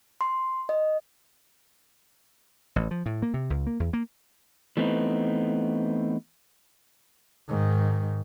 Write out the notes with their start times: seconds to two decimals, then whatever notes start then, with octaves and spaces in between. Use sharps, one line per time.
0.21 C6
0.69 D#5
2.76 A1
2.91 F3
3.06 A2
3.22 A#3
3.34 C3
3.50 C#2
3.67 A#3
3.80 E2
3.93 A#3
4.77 E3 A3 B3 C4 D#4
7.49 G#2 D#3